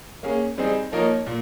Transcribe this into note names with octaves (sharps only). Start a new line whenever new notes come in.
A#3 C#4 G#4
G3 C4 D#4 G#4
F3 A#3 D#4 A#4 C#5
A#2